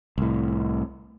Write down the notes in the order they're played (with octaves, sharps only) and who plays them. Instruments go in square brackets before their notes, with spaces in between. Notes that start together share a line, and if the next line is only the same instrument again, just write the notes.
[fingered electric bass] C2 A2